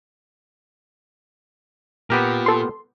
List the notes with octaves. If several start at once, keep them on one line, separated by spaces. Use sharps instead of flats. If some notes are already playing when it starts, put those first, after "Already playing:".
A#2 B3 G4 A#4
A4 C6